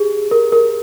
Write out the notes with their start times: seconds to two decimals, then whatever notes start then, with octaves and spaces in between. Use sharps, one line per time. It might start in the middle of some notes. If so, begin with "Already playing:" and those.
Already playing: G4 G#4
0.31 A#4
0.52 A#4